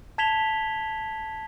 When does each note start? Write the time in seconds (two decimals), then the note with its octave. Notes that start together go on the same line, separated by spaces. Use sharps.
0.18 A5 G#6 B6 E7 F7 G7